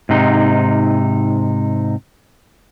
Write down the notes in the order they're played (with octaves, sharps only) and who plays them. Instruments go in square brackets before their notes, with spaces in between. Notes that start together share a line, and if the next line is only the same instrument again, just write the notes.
[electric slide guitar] G#2 C3 D#4